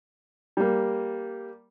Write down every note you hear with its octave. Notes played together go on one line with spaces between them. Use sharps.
G3 A#3